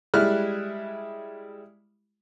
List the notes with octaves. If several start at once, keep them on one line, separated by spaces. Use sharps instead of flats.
G3 G#3 E4 F6 F#6